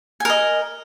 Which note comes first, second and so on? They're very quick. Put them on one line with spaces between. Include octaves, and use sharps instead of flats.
G#5 A#4 D#5